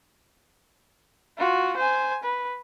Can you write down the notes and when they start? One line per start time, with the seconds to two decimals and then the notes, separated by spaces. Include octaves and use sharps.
1.38 F4 F#4
1.77 C5 G#5
2.23 B4